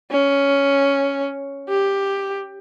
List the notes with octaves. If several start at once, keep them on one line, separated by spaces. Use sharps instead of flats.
C#4
G4